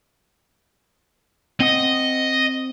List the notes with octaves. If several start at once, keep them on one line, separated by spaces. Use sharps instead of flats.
C4 D#5 F#5 D#6